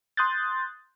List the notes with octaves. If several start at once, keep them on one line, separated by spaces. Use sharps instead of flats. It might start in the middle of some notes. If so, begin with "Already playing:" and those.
C6 D#6 F#6 G6 A6